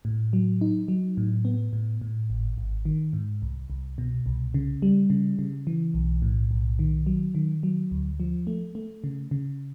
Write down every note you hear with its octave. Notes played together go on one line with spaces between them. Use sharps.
A2
F#3
D#4
F#3
A2
B3
A2
A2
G#1
G#1
D#3
G#2
C2
C2
B2
C2
C#3
G3
C#3
C#3
E3
B1
A2
B1
D#3
F#3
D#3
F#3
D2
F3
A3
A3
C#3
C#3